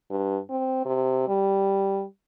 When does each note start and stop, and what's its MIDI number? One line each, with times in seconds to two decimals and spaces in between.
0.11 0.38 43
0.50 0.83 60
0.85 1.25 48
1.28 2.04 55